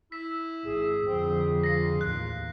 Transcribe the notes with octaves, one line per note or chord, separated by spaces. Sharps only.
E4 B6
G#1 G#4
F2 D3 C4
F4 A#6 C7
A1 D#2 F#6